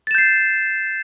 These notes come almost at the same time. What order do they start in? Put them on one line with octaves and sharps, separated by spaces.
A6 E7 G6 C7